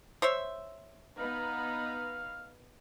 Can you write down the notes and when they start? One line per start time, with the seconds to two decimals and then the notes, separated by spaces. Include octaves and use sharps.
0.22 C5 C#5 E5
1.19 B3 D#4 B4 F5